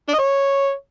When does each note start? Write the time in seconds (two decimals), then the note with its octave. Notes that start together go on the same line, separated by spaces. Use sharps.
0.09 D4
0.14 D#5
0.19 C#5